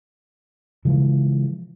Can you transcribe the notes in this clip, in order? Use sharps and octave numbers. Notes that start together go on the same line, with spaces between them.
C#3 E3 F3 G#3